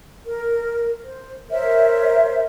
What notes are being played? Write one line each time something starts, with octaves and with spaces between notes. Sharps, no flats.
A#4
C5
A#4 C5 C#5 E5